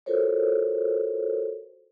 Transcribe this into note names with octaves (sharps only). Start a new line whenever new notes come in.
F4 F#4 A4 A#4 C5 C#5